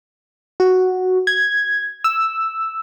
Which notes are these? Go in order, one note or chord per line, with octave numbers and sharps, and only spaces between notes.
F#4
G#6
E6